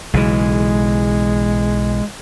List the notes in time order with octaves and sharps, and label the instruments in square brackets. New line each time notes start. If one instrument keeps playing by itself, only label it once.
[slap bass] B1 C#3 E3 [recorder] G#3